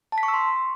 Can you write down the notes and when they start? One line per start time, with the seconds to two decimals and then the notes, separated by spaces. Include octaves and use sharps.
0.12 A5
0.18 B6
0.23 C#6
0.28 E6
0.34 C6